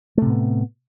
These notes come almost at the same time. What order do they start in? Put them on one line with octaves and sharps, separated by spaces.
A3 C3 A2 B3